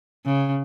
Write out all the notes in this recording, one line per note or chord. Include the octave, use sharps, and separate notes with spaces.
C#3